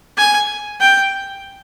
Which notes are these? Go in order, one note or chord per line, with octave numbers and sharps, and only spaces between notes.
G#5
G5